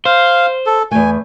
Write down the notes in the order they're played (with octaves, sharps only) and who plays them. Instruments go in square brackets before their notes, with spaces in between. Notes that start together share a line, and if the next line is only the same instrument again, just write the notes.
[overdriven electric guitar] C5 [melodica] F5
[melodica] A4
[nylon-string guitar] E2 A3 [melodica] G#5